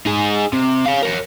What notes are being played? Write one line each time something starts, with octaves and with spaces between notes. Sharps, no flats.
D#4 G#4
C3
C#5 F5
A#4 C#5